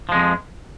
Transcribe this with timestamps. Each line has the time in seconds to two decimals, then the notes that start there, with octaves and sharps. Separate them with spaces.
0.09 F3
0.12 G#3
0.15 F2